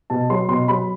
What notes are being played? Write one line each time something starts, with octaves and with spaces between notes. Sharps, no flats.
B2 A5
F#3 C6
B2 C6
F#3 B5